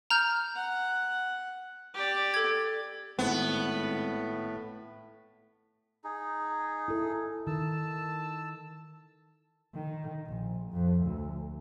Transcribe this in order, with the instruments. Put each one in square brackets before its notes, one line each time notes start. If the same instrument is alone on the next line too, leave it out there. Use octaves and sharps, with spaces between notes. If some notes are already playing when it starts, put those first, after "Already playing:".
[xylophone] A#5 F6 G6
[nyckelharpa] F#5
G4 D5
[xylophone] A4 G#6
[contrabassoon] G#1 [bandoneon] A2 A3 [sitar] B3
[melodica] D#4 G#4
[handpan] E4 A4
[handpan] D#3 [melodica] A5 E6
[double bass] D#3
A#1
F2
D2